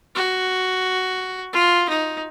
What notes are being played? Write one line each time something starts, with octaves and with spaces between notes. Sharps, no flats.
F#4
F4
D#4